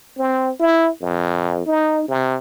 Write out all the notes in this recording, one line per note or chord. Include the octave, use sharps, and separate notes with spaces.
C4
E4
F2
D#4
C3